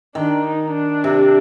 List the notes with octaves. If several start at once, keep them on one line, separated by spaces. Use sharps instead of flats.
D#3 D4
D#4
D4
C3